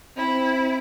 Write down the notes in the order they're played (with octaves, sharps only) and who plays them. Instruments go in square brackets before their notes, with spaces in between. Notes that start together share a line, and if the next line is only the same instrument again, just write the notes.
[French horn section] C4 [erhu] E4